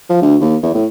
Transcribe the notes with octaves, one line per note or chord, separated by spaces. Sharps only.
F3
D2
D#2
E2
A2